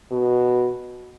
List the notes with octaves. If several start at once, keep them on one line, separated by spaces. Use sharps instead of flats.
B2